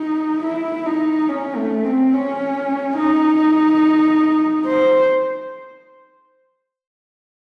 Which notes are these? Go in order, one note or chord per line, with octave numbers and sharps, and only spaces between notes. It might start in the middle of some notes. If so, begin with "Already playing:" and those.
Already playing: D#4
E4
D#4
C#4
A3
C4
C#4
D#4
C5